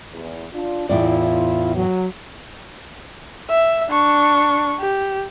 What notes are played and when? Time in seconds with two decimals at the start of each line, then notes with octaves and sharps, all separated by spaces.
0.12 E2
0.54 D4 F4
0.89 E2 A2 E4 F4 D5
1.76 F#3
3.49 E5
3.89 D4 C#6
4.80 G4